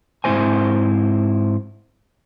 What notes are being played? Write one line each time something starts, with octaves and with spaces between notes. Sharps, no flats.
G#2 C4 D#4 E4 C5 G#5